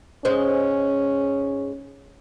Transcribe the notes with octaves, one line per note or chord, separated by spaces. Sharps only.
G#2 G#3 C#4 C5